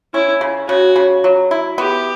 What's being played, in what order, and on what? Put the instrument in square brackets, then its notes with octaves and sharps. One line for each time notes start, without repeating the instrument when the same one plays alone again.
[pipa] C#4 [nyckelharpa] E4
[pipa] C#3
[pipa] C#3 [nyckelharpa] F#4
[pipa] C#3
F#3
E4
[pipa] B3 [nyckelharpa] G4